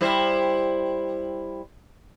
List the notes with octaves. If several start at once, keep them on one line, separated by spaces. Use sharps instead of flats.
G3 E4 C5